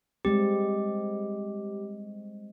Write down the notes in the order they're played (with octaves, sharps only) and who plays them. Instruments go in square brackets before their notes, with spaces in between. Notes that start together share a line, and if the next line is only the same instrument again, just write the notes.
[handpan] G3 G#3 C4 [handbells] G4